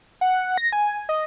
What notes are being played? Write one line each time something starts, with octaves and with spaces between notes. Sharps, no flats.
F#5
A#6
G#5
D#5